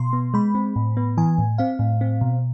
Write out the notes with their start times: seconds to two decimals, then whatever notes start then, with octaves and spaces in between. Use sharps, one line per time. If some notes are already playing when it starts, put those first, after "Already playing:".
Already playing: B2 C6
0.13 B3
0.34 G#3 B5
0.55 C4
0.76 A2
0.97 B3
1.17 E3 G#5
1.38 A2
1.58 C4 F5
1.79 A2
2.01 C4
2.21 B2